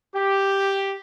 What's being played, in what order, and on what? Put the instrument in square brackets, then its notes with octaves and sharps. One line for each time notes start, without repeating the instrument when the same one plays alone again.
[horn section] G4